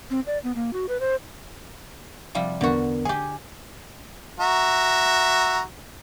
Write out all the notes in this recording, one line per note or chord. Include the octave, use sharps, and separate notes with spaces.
C4
D5
B3
A#3
F#4
B4
C5
C3 F3 G3
E2 D3 B3 F#4 A#4
G4 G#4 G#5
F#4 E5 A#5